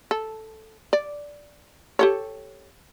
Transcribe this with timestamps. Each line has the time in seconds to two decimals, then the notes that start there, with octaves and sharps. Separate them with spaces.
0.11 A4
0.93 D5
1.99 G4 A4 C#5